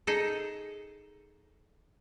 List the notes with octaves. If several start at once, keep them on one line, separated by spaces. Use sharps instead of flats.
D#4 G#4 A4